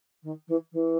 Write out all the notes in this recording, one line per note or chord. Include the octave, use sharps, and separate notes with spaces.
D#3
E3
E3